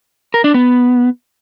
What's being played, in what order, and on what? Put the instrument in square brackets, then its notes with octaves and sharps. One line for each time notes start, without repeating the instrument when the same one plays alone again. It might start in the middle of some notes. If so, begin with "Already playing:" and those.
[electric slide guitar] A#4
D4
B3